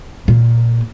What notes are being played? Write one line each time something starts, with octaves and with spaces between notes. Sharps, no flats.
A#2